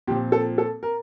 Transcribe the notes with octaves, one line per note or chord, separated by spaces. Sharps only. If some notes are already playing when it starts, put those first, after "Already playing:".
A#2 F3 C4 G4
A4
A4
A#4